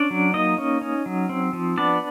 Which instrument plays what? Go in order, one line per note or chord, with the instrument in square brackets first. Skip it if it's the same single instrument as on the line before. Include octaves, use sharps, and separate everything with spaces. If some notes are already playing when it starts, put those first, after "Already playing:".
Already playing: [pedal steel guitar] C#4 D4 D5
F#3
A#3 D#4 D#5
C#4
C#4
F#3
C4
F3
B3 D4 D5